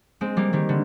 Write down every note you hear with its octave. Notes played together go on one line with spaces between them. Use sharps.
G#3 C4
G3 A#3
D#3 G3
D3